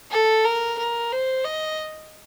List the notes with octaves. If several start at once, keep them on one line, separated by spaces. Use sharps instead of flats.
A4
A#4
A#4
C5
D#5